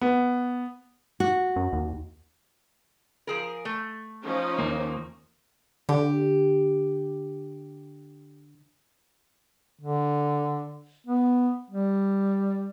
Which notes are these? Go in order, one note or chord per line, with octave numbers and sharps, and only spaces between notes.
B3
F#4
F#2
D#2
F3 G#4 A#4
A3
F3 C#4 D#4
D#2 A#3
D3 G4
D3
B3
G3